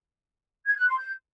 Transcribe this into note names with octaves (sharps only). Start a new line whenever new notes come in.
G#6
F#6
C6
G6